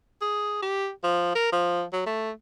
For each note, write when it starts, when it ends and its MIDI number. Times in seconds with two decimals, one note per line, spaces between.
0.21 0.59 68
0.62 0.89 67
1.03 1.33 53
1.35 1.50 70
1.52 1.83 53
1.93 2.06 54
2.06 2.31 57